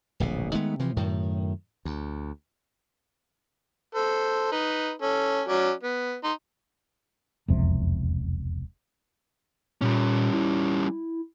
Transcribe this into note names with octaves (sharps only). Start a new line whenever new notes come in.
D1 A#1 B2
D#3 G#3 A3 B3
C3 E3 F3
F#2 A2 D#3
D2
A4 C5
D#4 B4
C#4 A4
F#3 C#4 D5
B3
D#4 C6
E1 C2 F2 C3
A#2 G3 C#4
E4